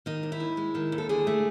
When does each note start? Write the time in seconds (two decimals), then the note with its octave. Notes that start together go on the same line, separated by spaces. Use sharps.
0.06 D#3 D#4
0.23 D#2
0.32 E4
0.40 D#2
0.57 G#3
0.75 D#3
0.92 D#2
0.98 A4
1.09 D3 G#4
1.27 A3